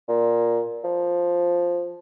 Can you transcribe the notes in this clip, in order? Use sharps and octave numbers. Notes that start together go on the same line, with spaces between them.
A#2
F3